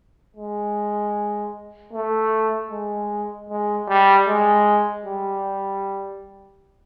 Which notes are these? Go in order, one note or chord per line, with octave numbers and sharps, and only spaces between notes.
G#3
A3
G#3
G#3
G3
G#3
G3